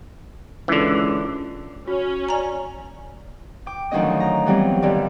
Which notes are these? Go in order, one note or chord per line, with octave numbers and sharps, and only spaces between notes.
C#2 D3 E3
C#4 F#4
D5 G#5 A#5
G5 D6
D2 D#3 F3 F#3 C#4 D#5
A#5
E3 F#3 G3 B3 C4 F4
G2 D3 D#3 G3